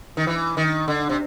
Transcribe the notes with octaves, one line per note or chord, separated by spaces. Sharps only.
D#3
E3
D#3
D3
C3